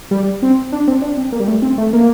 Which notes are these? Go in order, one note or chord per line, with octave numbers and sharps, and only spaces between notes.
G3
C4
D4
C4
D4
C4
A#3
G3
A3
C4
A3
A#3